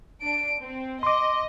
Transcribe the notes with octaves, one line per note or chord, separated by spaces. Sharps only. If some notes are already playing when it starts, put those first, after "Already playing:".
D4 D7
C4
D#5 C6 D6